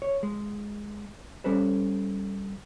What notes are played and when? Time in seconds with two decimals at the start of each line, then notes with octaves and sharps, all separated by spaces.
0.02 C#5
0.23 G#3
1.44 G3 C#4 A4 B4 C5